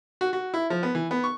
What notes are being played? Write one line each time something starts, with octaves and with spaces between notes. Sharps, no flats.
F#4
F#4
E4
F3
B3
E3
B3
C#6